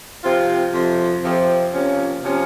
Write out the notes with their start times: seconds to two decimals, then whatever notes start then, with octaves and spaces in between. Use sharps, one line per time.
0.24 C3 F3 C4 F4
0.74 F2 C3 F3
1.23 F2 C3 F3
1.74 C3 F3 A#3 C#4
2.23 C3 F3 A#3 C#4